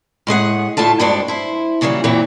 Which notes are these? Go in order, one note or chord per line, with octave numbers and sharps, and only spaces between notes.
A2 G#3 G#4 F#5
D2 A2 A3 F4 A5
G2 G#3 D4 F#4 C5 D5
E4 C5
A#2 C#3 E3 F#3 G3
F#2 A#2 E3 F#3 C4